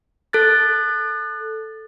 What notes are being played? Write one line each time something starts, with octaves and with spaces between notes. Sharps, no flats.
A4 F#6 A6